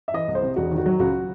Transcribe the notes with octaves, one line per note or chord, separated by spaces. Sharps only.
E5
E3 D#5
C2
C5
C3
E1 F#4
D#3
F#4
F#3
C#2 F#4